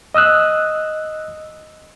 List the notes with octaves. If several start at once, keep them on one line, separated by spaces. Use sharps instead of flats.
D#5 D#6 E6 F#6